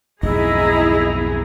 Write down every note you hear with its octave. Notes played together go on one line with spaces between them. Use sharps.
B1 F2 G#2 E4 G#4 D#5 A#5